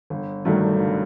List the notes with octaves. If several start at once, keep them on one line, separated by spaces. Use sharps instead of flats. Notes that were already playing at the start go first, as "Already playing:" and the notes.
G1
G2 D#3 F#3 A3
G1